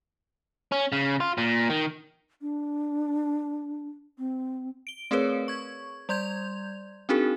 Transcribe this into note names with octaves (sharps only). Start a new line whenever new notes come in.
C#4
C#3
F4
A#2
D#3
D4
C4
D7 G7
A3 C4 G#4 A#4 B4 C#5
C#6 G#6
G3 D5 C6 G6 G#6 F7
C4 D4 D#4 F#4 G#4 A#4